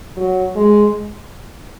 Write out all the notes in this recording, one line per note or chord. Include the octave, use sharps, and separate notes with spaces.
F#3
G#3